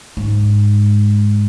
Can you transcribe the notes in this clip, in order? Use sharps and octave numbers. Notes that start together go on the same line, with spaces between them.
G#2